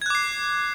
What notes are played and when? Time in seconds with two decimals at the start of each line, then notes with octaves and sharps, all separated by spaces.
0.02 G#6
0.06 F#6
0.10 D6
0.15 C7